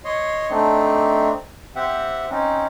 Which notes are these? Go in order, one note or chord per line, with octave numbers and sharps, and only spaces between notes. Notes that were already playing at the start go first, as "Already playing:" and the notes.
C#5 D#5 C6
A3 C4 D4 D#4
C4 G4 E5 F#5
C4 C#4 D#4